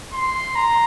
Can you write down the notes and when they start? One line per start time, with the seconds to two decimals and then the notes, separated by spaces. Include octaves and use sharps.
0.13 C6
0.55 A#5